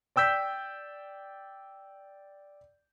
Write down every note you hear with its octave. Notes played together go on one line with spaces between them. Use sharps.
D5 G5 E6 G6 B6